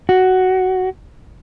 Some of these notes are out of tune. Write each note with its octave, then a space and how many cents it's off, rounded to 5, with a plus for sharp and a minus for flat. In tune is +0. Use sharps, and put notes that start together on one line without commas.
F#4 +10